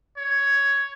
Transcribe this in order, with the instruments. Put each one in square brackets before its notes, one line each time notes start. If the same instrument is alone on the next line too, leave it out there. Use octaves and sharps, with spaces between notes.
[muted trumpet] C#5